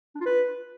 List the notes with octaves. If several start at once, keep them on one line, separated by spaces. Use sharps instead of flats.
D4
F4
B4